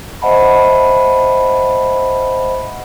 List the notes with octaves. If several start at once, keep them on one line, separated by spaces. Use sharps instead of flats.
C5 D#5 E5 F#5 A5 B5